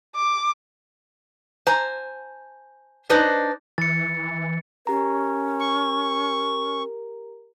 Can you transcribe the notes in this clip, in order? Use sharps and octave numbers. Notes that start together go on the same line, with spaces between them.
D6
C5 G#5 A#5
D4 D#4 B4 C5 D5 D#5
E3 A6 C#7
C#4 G4 A#4 A#5
C#6